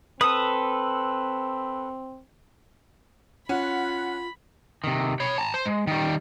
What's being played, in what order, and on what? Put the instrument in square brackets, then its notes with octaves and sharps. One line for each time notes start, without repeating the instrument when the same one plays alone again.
[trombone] C4 [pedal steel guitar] A4 B4 [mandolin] D#6
[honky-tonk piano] C#4 [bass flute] F4 [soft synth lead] F#5 [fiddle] B5
[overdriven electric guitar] C3 D#3
C#5 B5
A5 A#5
C5
G#3
D#3 G3